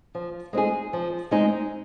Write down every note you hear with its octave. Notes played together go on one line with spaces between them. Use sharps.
F3
G#3 C4 D#4 G#4
F3
G#3 C4 D#4 G#4